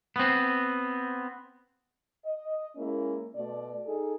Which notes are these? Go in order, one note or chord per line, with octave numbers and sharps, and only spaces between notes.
B3 C4
D#5
G#3 A#3 C#4 E4
B2 A3 D5
D#4 G#4 A4